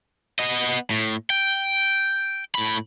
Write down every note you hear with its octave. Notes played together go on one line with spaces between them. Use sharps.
B3 D#5
A2
G5
A2 B5